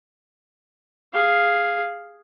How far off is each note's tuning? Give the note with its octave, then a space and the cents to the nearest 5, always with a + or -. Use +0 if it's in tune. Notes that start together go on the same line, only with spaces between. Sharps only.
G#4 -5 F5 +0